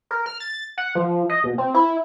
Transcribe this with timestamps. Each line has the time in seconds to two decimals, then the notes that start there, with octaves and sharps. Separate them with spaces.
0.11 A#4
0.26 F6
0.40 A6
0.78 F#5
0.95 F3
1.29 D#5
1.44 B2
1.58 C4
1.74 E4